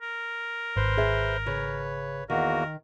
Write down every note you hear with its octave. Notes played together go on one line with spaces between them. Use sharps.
A#4
G#1 B4 C5 C6
G#4 E5
C#3 B4 C#5
E2 D#3 A#3 F#4 A#4